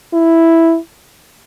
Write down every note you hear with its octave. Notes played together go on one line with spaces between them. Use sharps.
E4